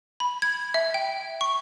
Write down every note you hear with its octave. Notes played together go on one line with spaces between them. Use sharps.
B5
G#6
E5
G5
C#6